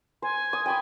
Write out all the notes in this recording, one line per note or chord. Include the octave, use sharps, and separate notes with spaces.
C5 G#5
D#6
G5 B5 D#6